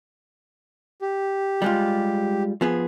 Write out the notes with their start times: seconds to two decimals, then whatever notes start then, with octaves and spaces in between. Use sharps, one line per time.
1.02 G4
1.62 G3 G#3 F4
2.61 F3 B3 G#4